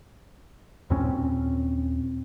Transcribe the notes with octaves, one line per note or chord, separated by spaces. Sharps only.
D#2 A#2 C4 C#4